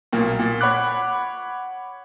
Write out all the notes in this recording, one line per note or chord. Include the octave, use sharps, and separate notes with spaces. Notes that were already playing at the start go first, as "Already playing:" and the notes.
B1 A#2 A#3
A#2
C#5 F#5 B5 D6 F#6